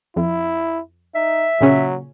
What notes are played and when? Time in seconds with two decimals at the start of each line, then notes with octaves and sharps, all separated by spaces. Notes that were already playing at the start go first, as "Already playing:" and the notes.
0.16 F2 E4
1.15 D#4 E5
1.61 A#2 C#3 F#3 C#4